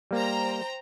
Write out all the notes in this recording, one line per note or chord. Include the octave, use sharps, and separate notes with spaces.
G3 A#3 C5 G5 A#5